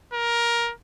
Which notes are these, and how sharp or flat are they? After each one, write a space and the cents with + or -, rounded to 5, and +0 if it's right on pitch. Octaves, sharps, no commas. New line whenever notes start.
A#4 +15